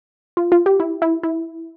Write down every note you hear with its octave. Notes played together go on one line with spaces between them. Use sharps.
F4
F4
G4
E4
E4
E4